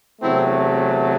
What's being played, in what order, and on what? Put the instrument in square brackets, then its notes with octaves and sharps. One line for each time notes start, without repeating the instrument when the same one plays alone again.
[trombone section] E2 C3 F#3 A3 C4 E4